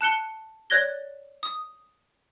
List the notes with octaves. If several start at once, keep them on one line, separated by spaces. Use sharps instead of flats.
A5 F#6 C#7 G7
C#5 D5 F#6 G#6 A#6 G7
D#6